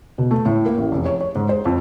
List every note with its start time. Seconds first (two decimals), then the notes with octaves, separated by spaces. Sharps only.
0.18 B2
0.31 A3
0.45 A2
0.66 A#3
0.78 A1
0.92 F1
1.06 C#5
1.21 C#5
1.35 G#2
1.49 C5
1.65 F2